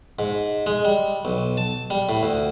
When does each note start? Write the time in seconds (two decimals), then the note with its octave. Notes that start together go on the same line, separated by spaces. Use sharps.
0.19 G#2
0.66 G#3
0.85 G3
1.25 B1
1.57 A5
1.90 G3
2.09 A2
2.23 D2